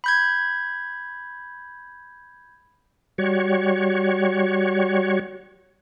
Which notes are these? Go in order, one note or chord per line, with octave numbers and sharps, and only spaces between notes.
B5 G6 G#6
G3 F#4 C#5